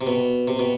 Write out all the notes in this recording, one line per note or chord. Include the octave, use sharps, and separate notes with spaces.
C3
B2
C3
B2